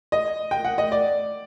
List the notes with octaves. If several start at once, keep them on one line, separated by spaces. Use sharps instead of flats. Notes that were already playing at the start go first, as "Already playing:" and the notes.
D#5
G5
F#5
D#5
D5